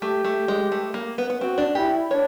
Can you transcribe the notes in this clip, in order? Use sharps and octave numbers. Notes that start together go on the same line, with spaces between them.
A3 G4
A3
G#3
A3
A#3
B3
B3
C4 F#4
D4
E4 G4
D4 C#5